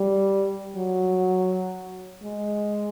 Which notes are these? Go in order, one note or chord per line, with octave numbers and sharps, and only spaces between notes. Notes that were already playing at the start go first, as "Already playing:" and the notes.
Already playing: G3
F#3
G#3